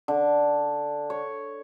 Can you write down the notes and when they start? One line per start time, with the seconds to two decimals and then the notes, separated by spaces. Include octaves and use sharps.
0.08 D3
1.10 C#5